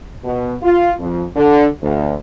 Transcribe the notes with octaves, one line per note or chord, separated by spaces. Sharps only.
B2
F4
F2
D3
D2